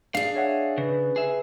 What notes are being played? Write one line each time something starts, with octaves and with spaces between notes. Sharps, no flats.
D4 G#4 F5
C#5 E5 F#5
C#3 B4
G#4 E5